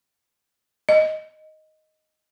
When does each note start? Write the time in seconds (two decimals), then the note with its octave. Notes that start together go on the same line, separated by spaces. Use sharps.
0.89 D#5